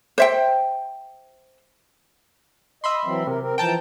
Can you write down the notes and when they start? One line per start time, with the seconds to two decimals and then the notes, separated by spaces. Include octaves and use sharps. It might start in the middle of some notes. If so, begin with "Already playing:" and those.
0.18 C5 E5 G5
2.84 D#5 E5 B5 C6
3.05 E3 F#3 C4
3.27 C3 A#4
3.41 C4 A#4
3.58 E3 F3 G5 A5 A#5 G6